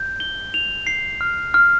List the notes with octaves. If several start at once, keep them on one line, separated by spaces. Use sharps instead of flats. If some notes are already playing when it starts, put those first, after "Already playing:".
Already playing: G6
G7
F7
C7
F6
F6